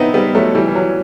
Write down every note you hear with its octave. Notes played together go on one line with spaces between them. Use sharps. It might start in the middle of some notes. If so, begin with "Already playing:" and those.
Already playing: B3 C4 D#4 E4
G3 B3
F#3 A3
E3 G3
E3
F#3